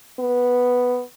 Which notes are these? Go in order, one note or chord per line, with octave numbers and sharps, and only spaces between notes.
B3